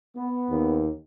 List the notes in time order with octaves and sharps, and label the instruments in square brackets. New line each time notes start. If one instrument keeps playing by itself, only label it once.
[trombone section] B3
[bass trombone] D#2